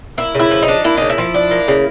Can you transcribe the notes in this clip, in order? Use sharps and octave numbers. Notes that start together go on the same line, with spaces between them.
A#3 E4
C#3 E4
F3
D#4
D4
A#3 E4
C#3 D#4
E4
F3
D4
A#3
C#3